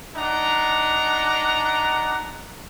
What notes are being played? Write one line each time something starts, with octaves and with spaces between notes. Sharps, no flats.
D4 D#4 F#5 A#5